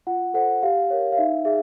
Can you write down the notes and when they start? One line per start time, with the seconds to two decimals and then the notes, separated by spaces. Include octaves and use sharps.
0.07 F4 F#5
0.34 A4 C5 F#5
0.63 G4 F5
0.90 A#4 C#5
1.12 F5
1.17 D#4 E5
1.45 G#4 E5